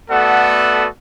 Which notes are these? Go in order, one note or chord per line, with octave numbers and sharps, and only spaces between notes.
A3 B3 F#4 A4 D5 F#5